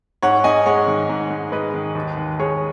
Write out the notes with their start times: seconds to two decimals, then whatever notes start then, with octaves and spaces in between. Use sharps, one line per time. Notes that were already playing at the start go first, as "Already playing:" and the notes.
0.22 G#2 C#5 F#5
0.44 G#2 D#5 G#5
0.66 G#3 C#5 F#5
0.87 D#3
1.09 G#2
1.30 G#2
1.52 G#3 B4 D#5
1.74 D#3
1.95 D#2
2.17 D#2
2.39 G#3 G#4 C#5